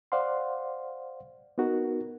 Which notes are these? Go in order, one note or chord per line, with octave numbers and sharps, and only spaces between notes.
C5 D5 F5 F#5 C6
B3 D#4 F#4 A#4